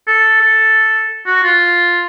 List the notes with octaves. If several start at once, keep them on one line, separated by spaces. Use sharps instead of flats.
A4
A4
F#4
F4